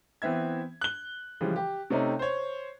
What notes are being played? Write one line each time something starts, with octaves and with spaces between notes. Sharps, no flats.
E3 B3 C4 E5 G#6
F#6 G7
C#3 E3 F3 G3 G#3
G4
C3 A3 C4 C#4 D#4
C5 C#5